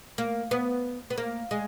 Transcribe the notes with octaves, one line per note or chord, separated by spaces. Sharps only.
A#3
B3
B3
A#3
G#3